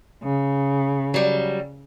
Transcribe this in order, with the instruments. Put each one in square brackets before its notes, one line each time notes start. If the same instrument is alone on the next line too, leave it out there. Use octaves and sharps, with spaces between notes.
[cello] C#3
[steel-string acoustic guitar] F#3 G3